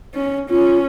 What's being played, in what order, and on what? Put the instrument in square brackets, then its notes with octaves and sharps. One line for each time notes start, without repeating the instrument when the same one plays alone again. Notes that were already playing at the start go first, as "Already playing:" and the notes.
[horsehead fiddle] C#4
[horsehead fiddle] C#4 [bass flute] F4